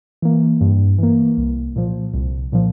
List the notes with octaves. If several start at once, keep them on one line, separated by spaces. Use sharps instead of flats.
E3 A#3
G2
E3 A#3
C2
A#2 F3
C2
A#2 F3